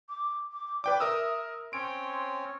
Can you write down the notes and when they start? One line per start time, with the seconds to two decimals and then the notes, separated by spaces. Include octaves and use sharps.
0.09 D6
0.52 D6
0.84 B4 D5 G5 D6
1.00 A#4 E5 D#6 E6
1.73 C4 C#4 C#5 C6 D7